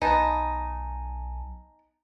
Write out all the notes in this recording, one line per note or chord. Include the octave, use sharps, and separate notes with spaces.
B1 B3 D#4 G#5 A5